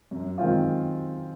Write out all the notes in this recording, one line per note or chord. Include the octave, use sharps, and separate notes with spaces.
F#2
D#3 G#3 C4 F4